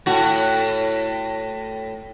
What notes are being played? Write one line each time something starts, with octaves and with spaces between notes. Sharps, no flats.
A2 F#4